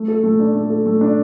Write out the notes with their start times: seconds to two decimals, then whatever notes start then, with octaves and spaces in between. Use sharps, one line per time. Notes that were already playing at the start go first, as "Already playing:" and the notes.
Already playing: A3
0.08 A4
0.24 A3
0.39 D4
0.55 A3
0.70 A4
0.86 A3
1.01 D4